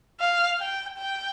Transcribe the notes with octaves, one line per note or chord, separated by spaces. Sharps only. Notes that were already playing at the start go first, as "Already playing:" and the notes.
F5
G5
G5